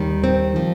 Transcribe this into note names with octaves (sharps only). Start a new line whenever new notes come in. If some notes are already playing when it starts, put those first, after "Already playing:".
Already playing: D#2 D#3 G3
C4
F3